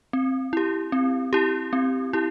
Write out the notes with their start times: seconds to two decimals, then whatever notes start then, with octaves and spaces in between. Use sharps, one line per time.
0.13 C4
0.53 E4 G4
0.92 C4
1.33 E4 G4
1.73 C4
2.13 E4 G4